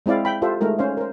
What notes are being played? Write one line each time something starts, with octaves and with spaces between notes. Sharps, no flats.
G#3 C4 E4 D5 F5
E5 G5 B5
F4 G4 A4 C5 E5
G#3 A3 D#4 A#4
C#4 D#4 C5 F5
A#4 C5